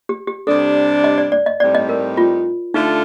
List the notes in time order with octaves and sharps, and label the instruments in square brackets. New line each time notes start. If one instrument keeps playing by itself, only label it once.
[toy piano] G4
G4
[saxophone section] C3 G3 D4 [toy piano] A4
[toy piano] D#5
D5
D5
D#5
[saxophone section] A2 G3 C4 D#4 [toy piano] D5
[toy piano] D#5
A#4
F4
[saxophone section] D3 A3 D4 F4 [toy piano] D#4